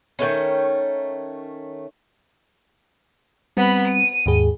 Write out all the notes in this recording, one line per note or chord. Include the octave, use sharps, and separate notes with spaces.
D#3 G#3 A3 C#4
G3 B3 C4 B5
D#7
D#2 G#2 G#4